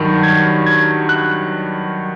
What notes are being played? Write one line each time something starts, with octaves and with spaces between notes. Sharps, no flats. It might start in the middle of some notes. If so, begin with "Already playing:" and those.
Already playing: G2 D#3 F#3
G#6
G#6
F#6